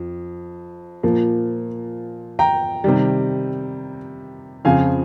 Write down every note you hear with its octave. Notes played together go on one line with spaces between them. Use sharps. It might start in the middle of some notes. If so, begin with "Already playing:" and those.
Already playing: F2
A#2 F3 A#3
G5 A#5
C3 D#3 G3
F2 C#3 F3 C4 F5 G#5